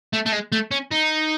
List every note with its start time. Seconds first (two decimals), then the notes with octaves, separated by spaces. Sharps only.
0.13 A3
0.26 A3
0.32 G#3
0.52 A3
0.71 C#4
0.92 D#4